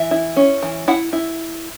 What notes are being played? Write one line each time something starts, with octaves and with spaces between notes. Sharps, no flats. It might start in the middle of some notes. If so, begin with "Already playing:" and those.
Already playing: E3 E5
E4
C#4
E3
E4 F#5
E4